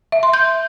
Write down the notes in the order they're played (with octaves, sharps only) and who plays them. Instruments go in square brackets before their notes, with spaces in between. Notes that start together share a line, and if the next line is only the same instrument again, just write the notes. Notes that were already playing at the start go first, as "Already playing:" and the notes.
[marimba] E5
C6
G6